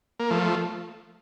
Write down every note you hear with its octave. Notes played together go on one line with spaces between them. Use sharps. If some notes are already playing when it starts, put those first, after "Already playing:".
A#3
F3 A3